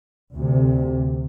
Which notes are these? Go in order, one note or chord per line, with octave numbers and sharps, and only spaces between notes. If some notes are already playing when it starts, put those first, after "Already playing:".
D2 C3